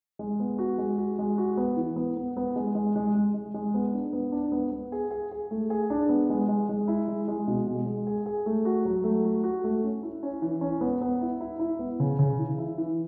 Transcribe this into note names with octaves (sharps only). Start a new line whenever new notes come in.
G#3
B3
F#4
G#3
F#4
G#3
F#4
B3
E3
B3
B3
B3
G#3
G#3
G#3
G#3
G#3
G#3
B3
D4
B3
D4
B3
B3
G#4
G#4
G#4
A3
G#4
D4
B3
G#3
G#3
G#3
E4
G#3
G#3
B2
G#3
G#3
G#4
G#4
A3
F#4
F#3
A3
F#4
F#4
A3
C#4
E4
C#4
E3
C#4
B3
B3
E4
E4
E4
B3
C#3
C#3
E3
E4
E3